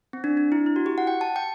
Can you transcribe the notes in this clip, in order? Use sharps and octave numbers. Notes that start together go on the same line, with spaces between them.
C4
D4
D4
E4
E4
F#4
G4
F#5
G5
A5
G5